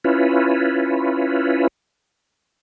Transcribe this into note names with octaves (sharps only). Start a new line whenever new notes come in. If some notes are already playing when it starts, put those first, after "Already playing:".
C#4 E4 F4 B4